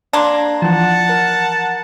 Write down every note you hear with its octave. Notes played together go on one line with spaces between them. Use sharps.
A#3 D4 A#5 C6 G#6
E3 F3 F#5 A5
A#4